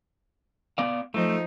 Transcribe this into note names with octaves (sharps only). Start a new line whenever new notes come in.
B3 D5 F5
F3 A3 D#4